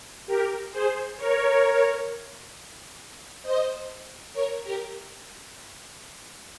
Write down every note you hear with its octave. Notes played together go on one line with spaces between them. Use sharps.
G4 A#4
G#4 C5
A#4 C#5
C5 D#5
A#4 C#5
G4 A#4